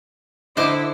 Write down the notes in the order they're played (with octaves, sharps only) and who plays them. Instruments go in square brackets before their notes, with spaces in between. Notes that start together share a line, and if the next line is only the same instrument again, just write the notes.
[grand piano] D3 [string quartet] E4 [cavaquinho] C5 D#5 D6